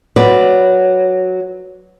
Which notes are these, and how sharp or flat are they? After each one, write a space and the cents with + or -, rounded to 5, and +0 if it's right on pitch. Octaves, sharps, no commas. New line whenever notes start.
F#3 +0 B4 +0 D5 +0